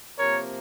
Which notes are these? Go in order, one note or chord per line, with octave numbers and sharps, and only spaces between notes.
C3 F3 A#3 A#4 C#5